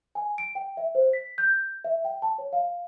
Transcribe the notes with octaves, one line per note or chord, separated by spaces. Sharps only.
G#5
D7
G5
E5
C5
B6
G6
E5
G5
A5
C#5
F5